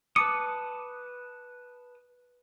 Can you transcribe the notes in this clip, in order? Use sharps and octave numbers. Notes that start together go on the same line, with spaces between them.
B4 A5 D6 D#6 C#7